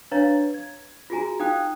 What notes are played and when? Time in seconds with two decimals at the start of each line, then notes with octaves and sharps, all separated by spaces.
0.11 D4 B4 C#5 F5 A#5 A6
0.54 G#6
1.10 F4 F#4 G#4 G#5 A#5
1.40 D#4 F5 G5 D#6 F#6